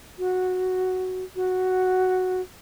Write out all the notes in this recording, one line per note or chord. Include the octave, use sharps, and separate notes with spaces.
F#4
F#4